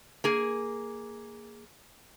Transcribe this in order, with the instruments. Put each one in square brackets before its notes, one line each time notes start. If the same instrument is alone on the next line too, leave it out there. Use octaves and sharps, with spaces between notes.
[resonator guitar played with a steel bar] A#3 G#4